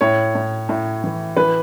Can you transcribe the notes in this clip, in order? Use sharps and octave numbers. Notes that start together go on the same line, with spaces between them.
A2 C#5
A2
A2
E3
E3 B4